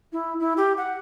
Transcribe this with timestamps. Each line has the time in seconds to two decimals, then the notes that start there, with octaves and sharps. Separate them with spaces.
0.12 E4
0.40 E4
0.57 G4
0.77 F#5